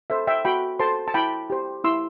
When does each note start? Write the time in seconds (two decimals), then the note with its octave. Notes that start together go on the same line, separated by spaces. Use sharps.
0.10 A4 C5 E5
0.27 E5 G5
0.45 F#4 G5 B5
0.79 A4 C5 A5 C6
1.08 A5
1.14 E4 G5 B5
1.50 G4 C5
1.84 E4 C6 E6